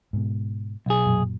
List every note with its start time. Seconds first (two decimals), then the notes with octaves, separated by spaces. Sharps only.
0.13 G#2 B2
0.86 B1 G#4
1.06 F#2 A#2 F#3